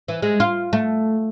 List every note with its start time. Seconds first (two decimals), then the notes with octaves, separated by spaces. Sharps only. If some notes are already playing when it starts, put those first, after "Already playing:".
0.08 E3
0.22 G#3
0.40 F4
0.73 A3